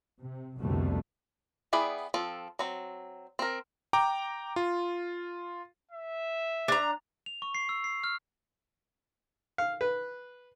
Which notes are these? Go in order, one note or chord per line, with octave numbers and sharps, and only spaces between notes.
C3
C2 F2 B2 D3 G3 A3
B3 E4 G#4 D5 G5
F3 C4 A4
F#3 C4
C4 A#4
G5 A#5 D6
F4
E5
D4 A#5
F7
C#6
C7
E6
C7
F6
F5
B4